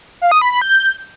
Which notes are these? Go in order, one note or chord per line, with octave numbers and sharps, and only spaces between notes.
F5
D#6
B5
B5
G6